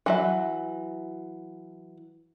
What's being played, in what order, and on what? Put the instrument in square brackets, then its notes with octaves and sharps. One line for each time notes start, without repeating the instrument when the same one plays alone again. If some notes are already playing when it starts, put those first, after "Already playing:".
[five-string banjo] E3 F#3 E5